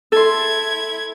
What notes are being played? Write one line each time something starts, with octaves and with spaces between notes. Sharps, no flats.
E4 A4 C6 G#6